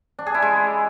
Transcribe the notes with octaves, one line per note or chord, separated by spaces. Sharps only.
D4
G#4
E4
G#3